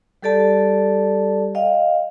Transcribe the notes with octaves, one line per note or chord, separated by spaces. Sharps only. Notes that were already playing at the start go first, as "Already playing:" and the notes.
G3 G4 A4 D5 A5
D#5 F5 G5